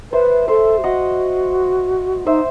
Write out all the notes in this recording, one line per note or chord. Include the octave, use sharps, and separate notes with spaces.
B4 C5 E5
A4 C5 E5
G4
F#4 D#5 F#5
D#4 C5 E5